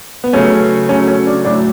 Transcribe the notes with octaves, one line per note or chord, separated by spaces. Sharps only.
B3
C#3 F#3 A3 C#4
C#3 F#3 A3 C#4
C#4
D4
A2 F#3 A3 D4